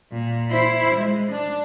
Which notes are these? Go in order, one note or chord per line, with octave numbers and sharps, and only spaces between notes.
A#2
E4 C5
G#3
D4